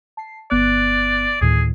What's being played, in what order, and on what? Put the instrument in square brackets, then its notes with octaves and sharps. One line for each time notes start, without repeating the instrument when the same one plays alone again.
[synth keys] A5 C7
[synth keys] G1 B3 F#6 [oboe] D5
[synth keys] D2 A2 D#3 [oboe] G#4